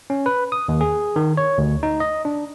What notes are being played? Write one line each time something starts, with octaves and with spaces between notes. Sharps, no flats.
C#4
B4
D#6
D#2
G#4
D#3
C#5
D2
D#4
D#5
D4